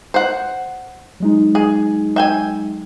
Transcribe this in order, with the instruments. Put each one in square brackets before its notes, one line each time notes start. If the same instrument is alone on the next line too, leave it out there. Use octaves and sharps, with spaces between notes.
[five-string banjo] C5 F#5
[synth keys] F#3 G#3 D#4
[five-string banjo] G#4
E5 G5 G#5